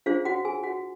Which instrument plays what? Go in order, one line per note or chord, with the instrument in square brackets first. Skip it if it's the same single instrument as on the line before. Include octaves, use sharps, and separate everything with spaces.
[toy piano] D4 F4 G#4 C5 F5
F#4 F#5
G#4 G#5
F#4 F#5